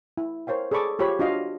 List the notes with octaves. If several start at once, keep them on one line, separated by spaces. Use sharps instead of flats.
E4
A#4 C5 C#5 F5 G5
G#4 A4 D5 B5 C#6 D6
F4 G4 C5 C#5 F5 B5
D4 F4 F#4 D#5 F5